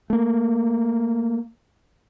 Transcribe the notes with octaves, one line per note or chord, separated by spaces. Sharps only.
A3 A#3